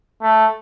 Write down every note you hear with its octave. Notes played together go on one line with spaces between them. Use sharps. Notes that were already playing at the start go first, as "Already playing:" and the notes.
A3